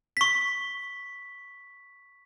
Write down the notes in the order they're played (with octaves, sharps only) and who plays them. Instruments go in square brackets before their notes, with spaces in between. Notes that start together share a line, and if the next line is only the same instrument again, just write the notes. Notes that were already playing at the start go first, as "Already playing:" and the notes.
[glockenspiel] C#6 B6